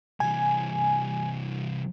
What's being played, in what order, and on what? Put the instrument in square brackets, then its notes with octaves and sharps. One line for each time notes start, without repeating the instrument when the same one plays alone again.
[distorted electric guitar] C2 E3 [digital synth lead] G#5